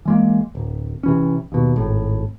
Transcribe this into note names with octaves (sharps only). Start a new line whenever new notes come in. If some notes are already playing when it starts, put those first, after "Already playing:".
E3 G#3 A#3
D1
C3 E3 C#4
D#2 B2
G#1 A2